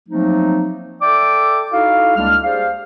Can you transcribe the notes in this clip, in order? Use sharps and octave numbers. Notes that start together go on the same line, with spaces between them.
F3 F#3 A3 A#3 C4 D#4
A4 D5 E5 G5 D6
D#4 E4 F#4 A4 F5
C#2 G3 G#3 A#3 D4 F6
G4 G#4 C5 D5 F5